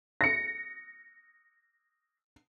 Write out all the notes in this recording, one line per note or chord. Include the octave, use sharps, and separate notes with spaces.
A#6 C#7